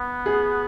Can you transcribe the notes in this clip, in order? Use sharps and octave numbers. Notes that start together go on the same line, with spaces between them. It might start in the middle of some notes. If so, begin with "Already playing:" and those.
Already playing: B3
G#4